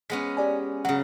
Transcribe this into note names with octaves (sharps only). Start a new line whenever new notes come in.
G#3 B3 C#4 B6
G4 D5 G#5
C#3 F#3 F#5